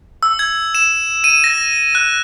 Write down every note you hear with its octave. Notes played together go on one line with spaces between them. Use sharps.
E6
G#6
E7
D#7
A#6
F#6